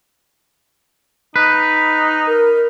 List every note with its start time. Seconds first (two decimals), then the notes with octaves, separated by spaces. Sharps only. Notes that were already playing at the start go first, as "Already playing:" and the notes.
1.36 D#4 B4
2.27 A#4